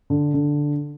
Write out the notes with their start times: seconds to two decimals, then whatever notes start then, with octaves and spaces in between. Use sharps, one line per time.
0.10 D3
0.34 D3